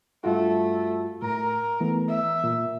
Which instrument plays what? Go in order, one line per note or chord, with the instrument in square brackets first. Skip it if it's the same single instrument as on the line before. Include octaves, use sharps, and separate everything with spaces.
[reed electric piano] G2 F4 F#4 [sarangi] A3
[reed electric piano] A2 A#5 [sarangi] A#4
[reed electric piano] E3 A3 B3
[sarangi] E5
[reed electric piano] A#2